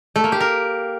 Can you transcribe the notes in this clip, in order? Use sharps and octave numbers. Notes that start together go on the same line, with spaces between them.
A3
A#3
G4
A#4